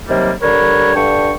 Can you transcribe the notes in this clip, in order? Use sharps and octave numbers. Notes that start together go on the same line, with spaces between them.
C3 D#3 F#3 G3 A#3
D3 G3 A#4 B4 C#5
G2 D3 D4 G5 C#6